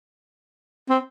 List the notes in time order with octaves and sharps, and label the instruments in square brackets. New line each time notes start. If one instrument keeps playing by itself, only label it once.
[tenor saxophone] C4